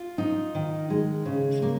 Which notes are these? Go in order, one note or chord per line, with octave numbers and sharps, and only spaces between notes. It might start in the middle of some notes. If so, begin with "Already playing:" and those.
Already playing: F4
D#4
D#3
G#3
C#3
A#3